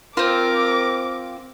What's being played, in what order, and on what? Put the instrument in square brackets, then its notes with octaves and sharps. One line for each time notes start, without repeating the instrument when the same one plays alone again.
[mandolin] C4 F4 [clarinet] A#4 [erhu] D6